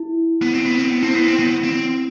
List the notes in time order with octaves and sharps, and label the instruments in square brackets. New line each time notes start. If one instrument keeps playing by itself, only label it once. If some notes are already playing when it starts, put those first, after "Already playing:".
Already playing: [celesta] E4
[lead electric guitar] B3
C4
B3
C4
B3
[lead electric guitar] C4 [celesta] E4
[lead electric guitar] B3
C4
B3
C4